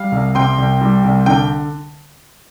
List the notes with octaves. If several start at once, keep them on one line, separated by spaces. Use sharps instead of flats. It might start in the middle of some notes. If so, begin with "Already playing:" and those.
Already playing: G3 F5
C2
C3 G5 C6
C2
G3
C2
D3 G5